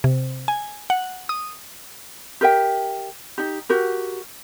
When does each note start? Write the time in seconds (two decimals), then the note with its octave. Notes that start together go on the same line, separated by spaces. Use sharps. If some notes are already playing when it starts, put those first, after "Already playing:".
0.04 C3
0.48 G#5
0.90 F#5
1.29 D#6
2.41 G4 A#4 E5 G5
3.38 D#4 G4
3.69 F#4 G4 A#4